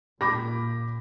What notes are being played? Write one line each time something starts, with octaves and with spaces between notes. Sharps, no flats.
A#2 B5 D6 A#6